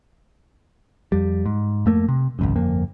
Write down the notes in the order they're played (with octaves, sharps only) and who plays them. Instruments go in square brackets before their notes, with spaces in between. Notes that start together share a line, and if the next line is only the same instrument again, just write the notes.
[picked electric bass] F2 G3
G#2
F2 A3 A#3
C3
G#1 C#2 F#2
G1 F2 A#3